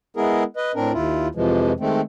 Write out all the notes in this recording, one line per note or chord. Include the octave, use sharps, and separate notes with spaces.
G#3 B3 E4 G#4 A#4
B4 D#5
A2 C4 D4 A#4
D#2 E4 F4
F2 C3 E3 F3 G#3
D#3 G#3 A3 C4